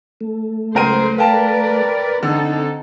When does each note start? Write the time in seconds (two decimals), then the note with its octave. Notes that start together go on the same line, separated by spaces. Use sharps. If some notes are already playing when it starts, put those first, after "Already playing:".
0.21 A3
0.75 C#2 F#3 A#4 C5 D#7
1.18 A#4 B4 D5 F5 G5 A5
2.23 D3 C4 D#4 A4